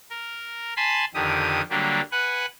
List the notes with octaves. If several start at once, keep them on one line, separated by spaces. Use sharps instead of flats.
A#4
G#5 A5 B5 C6
F2 D3 D#3 G4 D#6
D3 F#3 G3 A#3 D4 G4
B4 F#5 G#5 F#6